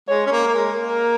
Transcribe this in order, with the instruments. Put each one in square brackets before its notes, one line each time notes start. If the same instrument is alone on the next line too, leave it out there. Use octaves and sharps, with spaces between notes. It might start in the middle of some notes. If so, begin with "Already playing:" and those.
[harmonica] G#3 [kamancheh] C#5
[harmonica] C#4
A#3
[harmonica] A#3 [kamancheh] A#4
[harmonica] G#3
[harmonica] A#3 [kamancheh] A#4